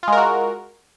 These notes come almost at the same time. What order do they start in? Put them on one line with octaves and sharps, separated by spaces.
F4 G#3 A#4 F#4